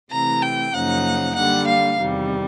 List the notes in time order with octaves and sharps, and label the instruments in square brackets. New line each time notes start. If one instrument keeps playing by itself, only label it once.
[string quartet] C3 E3 A3 [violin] A#5
[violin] G5
[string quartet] F#2 C#3 F3 A#3 D#4 [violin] F#5
[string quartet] D3 G3 A#3 [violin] F#5
[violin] F5
[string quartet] E2 C3 D#3 G3